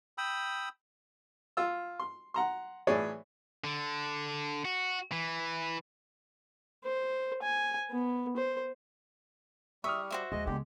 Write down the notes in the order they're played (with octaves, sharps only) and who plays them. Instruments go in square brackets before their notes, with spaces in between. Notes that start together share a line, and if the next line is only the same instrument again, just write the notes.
[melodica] G5 B5 D#6 E6
[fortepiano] F4 E6
C6
F#5 A#5 C6
A2 E3 G#4 C#5 D5
[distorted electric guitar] D3
F#4
E3
[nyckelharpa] C5
G#5
B3
C5
[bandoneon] G3 [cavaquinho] E5 [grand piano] C#6 D#6 F6
[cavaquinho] F#4 C5 E5
[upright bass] D#2 [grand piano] G#3 [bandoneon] D#5
[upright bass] C#2 B3 [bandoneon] D3 G4